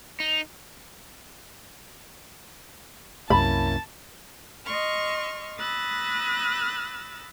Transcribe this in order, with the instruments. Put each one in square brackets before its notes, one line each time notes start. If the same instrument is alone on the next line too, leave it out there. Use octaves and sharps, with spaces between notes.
[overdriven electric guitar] D#4
[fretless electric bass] C2 F#2 [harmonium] A#3 C#4 E4 [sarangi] A5 [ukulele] B5
[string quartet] D#5 C6 C#6 F6
B5 D#6 E6 F#6 A6 A#6